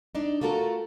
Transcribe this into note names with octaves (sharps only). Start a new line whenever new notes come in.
D4 D#4
A3 F4 F#4 A4 A#4